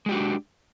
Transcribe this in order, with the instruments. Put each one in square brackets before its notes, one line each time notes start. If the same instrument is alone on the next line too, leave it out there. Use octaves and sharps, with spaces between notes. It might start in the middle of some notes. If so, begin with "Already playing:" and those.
[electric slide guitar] G#3
G4
F#4
D4